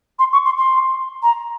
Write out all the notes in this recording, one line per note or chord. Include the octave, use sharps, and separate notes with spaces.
C6
C#6
C6
C6
A#5